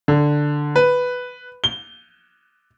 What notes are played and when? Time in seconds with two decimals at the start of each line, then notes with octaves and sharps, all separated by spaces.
0.08 D3
0.76 B4
1.64 G7